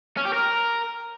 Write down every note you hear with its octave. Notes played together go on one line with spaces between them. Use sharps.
C#4
G4
A#4